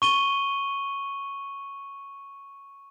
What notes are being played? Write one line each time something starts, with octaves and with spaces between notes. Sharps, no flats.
C#6 D#7 G7